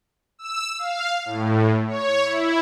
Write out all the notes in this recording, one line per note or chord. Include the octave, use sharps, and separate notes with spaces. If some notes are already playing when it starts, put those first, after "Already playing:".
E6
F5
A2
C#5
E4